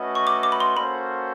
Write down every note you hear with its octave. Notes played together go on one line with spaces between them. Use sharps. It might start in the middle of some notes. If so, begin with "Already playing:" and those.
Already playing: A3 C#4 F#4 B4 D#5
C#6
D6
D6
B5
C6
A#3 C#4 F#4 A4 C5 B5